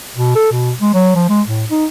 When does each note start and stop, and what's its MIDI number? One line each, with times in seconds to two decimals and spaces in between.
0.16 0.35 47
0.36 0.47 69
0.51 0.73 47
0.81 0.93 56
0.94 1.13 54
1.15 1.26 53
1.29 1.42 56
1.47 1.65 45
1.70 1.86 63